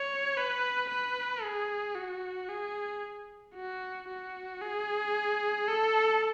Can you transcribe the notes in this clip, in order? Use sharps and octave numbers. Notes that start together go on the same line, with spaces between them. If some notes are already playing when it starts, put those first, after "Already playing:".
Already playing: C#5
B4
B4
G#4
F#4
G#4
F#4
F#4
G#4
A4